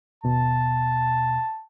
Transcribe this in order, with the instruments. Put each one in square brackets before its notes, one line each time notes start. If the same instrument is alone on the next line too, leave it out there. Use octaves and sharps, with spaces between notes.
[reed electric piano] D#2 B2 [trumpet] A5